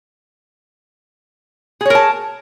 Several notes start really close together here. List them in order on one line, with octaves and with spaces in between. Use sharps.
G#4 C#5 A#4 A5